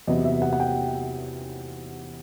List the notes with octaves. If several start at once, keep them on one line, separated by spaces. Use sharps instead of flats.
E2 C3 F#3 B3 D#5
E5
F#5
F#5
G5